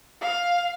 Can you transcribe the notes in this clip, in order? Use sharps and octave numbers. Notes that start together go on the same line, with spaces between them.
F5